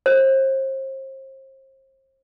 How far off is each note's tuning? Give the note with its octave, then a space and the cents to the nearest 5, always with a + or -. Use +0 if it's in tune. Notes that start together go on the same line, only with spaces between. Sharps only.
C5 +35